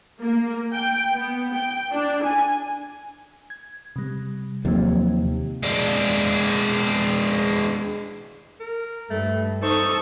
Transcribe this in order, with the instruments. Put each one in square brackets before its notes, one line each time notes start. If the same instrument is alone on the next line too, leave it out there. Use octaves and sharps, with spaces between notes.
[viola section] A#3
G5
B3
G5
D4
G#5
[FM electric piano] G#6
C3 G3
[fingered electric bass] D#2 C3 [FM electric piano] F3 F#3
[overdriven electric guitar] G#3 D4
[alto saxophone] A#4
[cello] G2 [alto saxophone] A3
[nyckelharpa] D#4 C#6 [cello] A4 [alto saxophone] C5